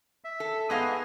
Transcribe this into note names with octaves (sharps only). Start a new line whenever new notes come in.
E5
A4
G#2 B3 G#4 D#5 F5